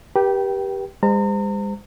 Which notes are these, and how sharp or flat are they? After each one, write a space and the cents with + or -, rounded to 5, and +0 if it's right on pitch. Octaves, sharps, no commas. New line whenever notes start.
G4 +0 B4 -45 G5 -20
G#3 -45 C5 -30 A#5 -35